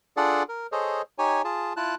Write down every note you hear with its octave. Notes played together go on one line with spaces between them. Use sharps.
D4 F4 G#4 A4 D5 F#5
A#4
G#4 A4 C5 C#5 D#5
D#4 G4 C#5 G#5
F4 G#4 A5
E4 F4 A5 F#6